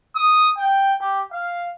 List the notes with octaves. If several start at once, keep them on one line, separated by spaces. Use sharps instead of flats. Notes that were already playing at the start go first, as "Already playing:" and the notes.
D#6
G5
G4
F5